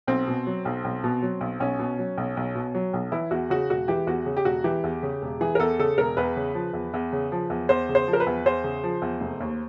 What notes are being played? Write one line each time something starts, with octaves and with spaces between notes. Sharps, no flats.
B1 C4
B2
F#3
B1
B1
B2
F#3
B1
B1 C#4
B2
F#3
B1
B1
B2
F#3
B1
E3 E4
E2 F#4
C#3 F#4
E1 F#4
E3 G4
E2 F#4
C#3
G4
E1 F#4
E3 G4
E2
C#3
E1
E3 G#4
A#4
E2 A4
C#3 A4
E1 A#4
E2 B4
C#3
F3
E2
E2
C#3
F3
E2
E2 C5
C#3
C5
F3
A#4
B4
E2
E2 C5
C#3
F3
E2
F1
D#2